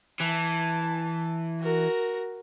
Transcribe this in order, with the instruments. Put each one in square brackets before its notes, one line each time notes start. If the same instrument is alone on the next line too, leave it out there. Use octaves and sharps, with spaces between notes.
[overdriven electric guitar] E3 [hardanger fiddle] A5
[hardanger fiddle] F#4 A#4